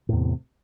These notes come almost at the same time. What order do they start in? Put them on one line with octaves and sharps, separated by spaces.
A2 E2 C3